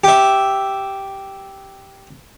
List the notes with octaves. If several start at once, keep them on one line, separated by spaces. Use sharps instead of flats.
G4 E5